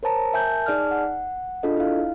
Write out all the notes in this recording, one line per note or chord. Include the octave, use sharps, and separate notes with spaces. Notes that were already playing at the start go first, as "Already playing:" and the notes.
A#4 C5 C#5 A5 A#5
A#4 E5 G#5 A5 G6
D#4 G#4 D5 G#5 A5 F6
F#5
D4 F4 G#4 A4 D#5
E4 F5